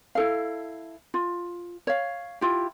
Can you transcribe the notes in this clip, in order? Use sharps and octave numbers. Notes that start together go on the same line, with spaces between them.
E4 A4 F5
F4
C#5 F5
E4 F4 G4